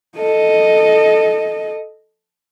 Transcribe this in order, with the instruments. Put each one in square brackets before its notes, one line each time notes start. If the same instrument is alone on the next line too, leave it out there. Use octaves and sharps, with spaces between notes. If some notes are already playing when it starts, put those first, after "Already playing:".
[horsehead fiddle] A4 D#5